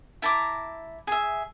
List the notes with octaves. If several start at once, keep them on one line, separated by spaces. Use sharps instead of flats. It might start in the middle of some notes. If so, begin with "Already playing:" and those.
E4 A5 A#5 D6
G#4 E5